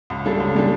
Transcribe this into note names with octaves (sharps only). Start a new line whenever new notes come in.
C#2
C#3 G3 D4 A4
C#2
C#3 G3 D4 A4